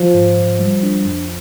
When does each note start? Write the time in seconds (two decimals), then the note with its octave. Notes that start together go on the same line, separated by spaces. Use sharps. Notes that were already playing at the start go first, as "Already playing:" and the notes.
Already playing: F3
0.14 G#2
0.38 G#2
0.59 G3
0.83 D4
1.05 F2